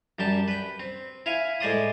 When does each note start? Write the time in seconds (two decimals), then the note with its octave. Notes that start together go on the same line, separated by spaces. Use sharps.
0.19 F#2 G3 G5 A5
0.48 B4 G5
0.80 C4
1.26 E4 F5 G#5
1.60 A2 G#3 C5 D5 C6 D#6